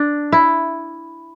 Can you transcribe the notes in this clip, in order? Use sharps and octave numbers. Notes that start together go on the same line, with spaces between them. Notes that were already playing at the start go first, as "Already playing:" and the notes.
Already playing: D4
E4